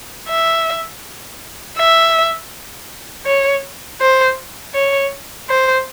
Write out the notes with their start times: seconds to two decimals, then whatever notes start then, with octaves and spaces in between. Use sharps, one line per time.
0.28 E5
1.78 E5
3.26 C#5
4.01 C5
4.75 C#5
5.49 C5